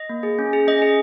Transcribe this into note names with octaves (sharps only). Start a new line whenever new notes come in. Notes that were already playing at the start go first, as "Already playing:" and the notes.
Already playing: D#5
A#3
G#4
C#4
G#4
C#4 D#5
G#4